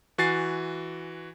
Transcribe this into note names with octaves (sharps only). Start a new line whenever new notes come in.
E3 F#4 G#5 A6 C7